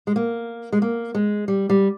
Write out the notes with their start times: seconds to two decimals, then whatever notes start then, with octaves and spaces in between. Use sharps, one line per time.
0.07 G#3
0.16 A#3
0.72 G#3
0.82 A#3
1.15 G#3
1.48 G3
1.69 G3